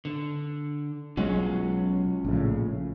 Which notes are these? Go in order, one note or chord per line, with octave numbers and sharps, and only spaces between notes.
D3
B1 F#3 G#3 C#4 F4 F#5
A#1 A2 C#3